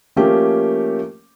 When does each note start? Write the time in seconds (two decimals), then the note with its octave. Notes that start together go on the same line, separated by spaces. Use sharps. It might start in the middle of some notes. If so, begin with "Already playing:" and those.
0.16 F3 A3 A#3 C#4 G4